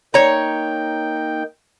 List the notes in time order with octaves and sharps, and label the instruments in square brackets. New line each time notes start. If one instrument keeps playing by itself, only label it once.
[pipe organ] A#3 D#4 G5 [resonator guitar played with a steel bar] C#5 A#5